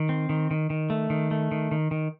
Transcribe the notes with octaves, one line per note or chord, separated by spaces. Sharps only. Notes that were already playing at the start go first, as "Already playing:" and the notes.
Already playing: D#3
C4
D#3
D#3
D#3
A3
D#3
A3
D#3
D#3
D#3